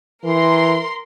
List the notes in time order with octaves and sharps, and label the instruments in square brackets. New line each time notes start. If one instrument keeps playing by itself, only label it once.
[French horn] E3 [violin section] A#4 C6